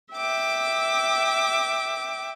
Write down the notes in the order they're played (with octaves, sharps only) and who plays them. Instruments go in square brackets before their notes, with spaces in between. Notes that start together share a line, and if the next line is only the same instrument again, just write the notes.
[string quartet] E5 G5 D6